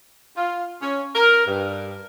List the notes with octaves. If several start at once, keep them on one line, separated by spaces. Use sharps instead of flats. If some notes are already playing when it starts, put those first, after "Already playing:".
F4
C#4
A#4
G2